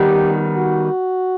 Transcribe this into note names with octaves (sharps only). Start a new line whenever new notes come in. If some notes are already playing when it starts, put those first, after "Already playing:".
Already playing: D#3 G3 B3 D#4 G4
F#4